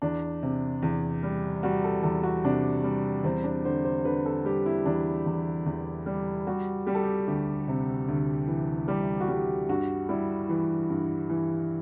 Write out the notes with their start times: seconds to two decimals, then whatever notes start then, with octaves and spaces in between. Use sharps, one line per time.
0.02 E2 D4
0.43 C3
0.83 E2
1.23 G3
1.63 G3 F#4
1.84 A4
2.03 E2 A4
2.23 F#4
2.44 C3 D4
2.84 G3
3.24 E2 C4
3.44 D4
3.65 D3 C5
3.85 C5
4.05 D3 B4
4.26 A4
4.45 G3 G4
4.66 E4
4.86 E2 D4
5.26 E2
5.66 E2
6.06 G3
6.47 G3 F#4
6.86 G3 G4
6.95 A4
7.03 G4
7.27 D2 G4
7.68 C3
8.08 D2
8.48 E3
8.88 G3 G4
9.21 F#4
9.28 G3 G4
9.69 G2 F#4
10.09 G3 E4
10.49 E3
10.90 G2
11.30 E3